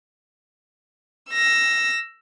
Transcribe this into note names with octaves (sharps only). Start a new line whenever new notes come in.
E6 A#6